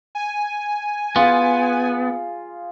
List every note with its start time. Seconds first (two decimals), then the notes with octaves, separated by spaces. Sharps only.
0.15 G#5
1.16 B3 F4 G#4